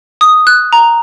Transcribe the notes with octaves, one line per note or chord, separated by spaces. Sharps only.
D#6
F#6
A#5